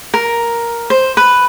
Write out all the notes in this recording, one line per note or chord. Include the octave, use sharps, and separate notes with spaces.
A#4
C5
B4